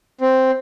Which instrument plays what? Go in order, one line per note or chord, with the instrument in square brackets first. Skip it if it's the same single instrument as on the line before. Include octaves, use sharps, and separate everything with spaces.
[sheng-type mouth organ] C4